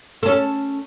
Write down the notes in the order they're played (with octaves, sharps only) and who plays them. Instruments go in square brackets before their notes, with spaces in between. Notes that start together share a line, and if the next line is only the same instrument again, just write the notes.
[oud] C#4 A4